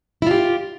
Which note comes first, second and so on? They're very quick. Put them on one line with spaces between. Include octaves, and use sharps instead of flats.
E4 F4 G4